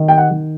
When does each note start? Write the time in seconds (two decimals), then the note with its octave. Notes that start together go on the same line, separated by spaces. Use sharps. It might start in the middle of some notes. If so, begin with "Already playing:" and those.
Already playing: D#3
0.08 G5
0.18 F#5
0.31 D#3